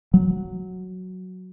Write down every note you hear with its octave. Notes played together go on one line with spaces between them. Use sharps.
F#3